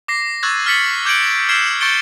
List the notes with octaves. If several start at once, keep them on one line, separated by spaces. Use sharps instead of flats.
D6 A#6 C7
C#6 E6 F#6 G#6 A6
F6 A6 B6 C#7 F#7
D6 G6 G#6 C#7 D7 F#7
E6 F6 G#6 C7 E7
C#6 G6 A6 C#7 D7 G7